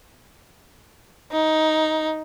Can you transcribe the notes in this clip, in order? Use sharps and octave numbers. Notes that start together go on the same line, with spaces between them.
D#4